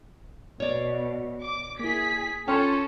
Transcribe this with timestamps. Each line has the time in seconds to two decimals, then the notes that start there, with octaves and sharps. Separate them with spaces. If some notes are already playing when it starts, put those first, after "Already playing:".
0.60 B2 C#5 D5
1.41 D6
1.79 A#3 E4 G#4 B6
2.48 C#4 F4 A4 G5 C6